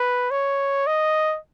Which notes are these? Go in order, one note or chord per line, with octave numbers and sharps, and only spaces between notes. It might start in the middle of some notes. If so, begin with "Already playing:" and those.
Already playing: B4
C#5
D#5